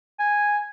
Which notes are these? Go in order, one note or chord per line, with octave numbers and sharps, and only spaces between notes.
G#5